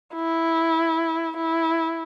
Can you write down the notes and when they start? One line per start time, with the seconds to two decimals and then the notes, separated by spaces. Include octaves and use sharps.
0.15 E4
1.37 E4